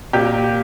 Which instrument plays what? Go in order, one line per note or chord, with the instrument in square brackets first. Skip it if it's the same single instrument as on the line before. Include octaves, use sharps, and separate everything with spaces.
[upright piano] A#2 G4